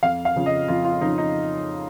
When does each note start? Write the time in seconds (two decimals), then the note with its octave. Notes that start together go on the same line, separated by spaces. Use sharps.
0.03 F2 F5
0.25 F5
0.36 C#3 F3
0.46 D#5
0.68 F2 F4
0.85 F4
1.01 C#3 F3 D#4
1.18 D#4